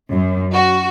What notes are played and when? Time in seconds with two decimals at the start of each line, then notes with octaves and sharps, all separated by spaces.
0.11 F#2
0.54 F#4